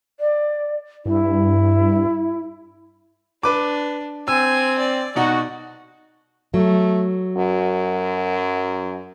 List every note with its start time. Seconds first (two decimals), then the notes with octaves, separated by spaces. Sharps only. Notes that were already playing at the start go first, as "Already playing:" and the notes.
0.20 D5
1.06 G2 E4
3.43 D4 B4 D6
4.28 C4 G#5 E6
4.79 D5
5.16 B2 D#4 F#4 D5 F#5
6.54 F#3 A3
7.37 F#2